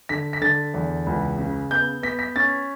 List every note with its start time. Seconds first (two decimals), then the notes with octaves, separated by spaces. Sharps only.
0.09 D3 B6
0.33 B6
0.41 D3 A6
0.74 E2
1.06 C#2
1.38 C#3
1.71 B3 G6
2.03 B3 B6
2.19 B6
2.36 C#4 A6